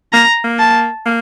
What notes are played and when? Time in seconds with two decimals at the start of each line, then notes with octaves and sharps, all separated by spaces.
0.13 A#3 A#5
0.44 A#3
0.59 A5
1.06 A#3